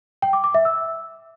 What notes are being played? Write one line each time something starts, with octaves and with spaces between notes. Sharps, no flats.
G5
D6
D6
E5
E6